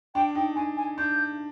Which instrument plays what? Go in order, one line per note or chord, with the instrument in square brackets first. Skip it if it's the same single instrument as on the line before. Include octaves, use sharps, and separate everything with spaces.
[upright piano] D4 [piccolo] G5
[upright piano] D#4 [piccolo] G5
[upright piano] D4 [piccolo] G#5
[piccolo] G#5
[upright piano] D4 [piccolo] G6